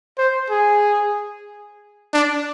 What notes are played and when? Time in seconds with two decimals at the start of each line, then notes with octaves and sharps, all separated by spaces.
0.18 C5
0.50 G#4
2.14 D4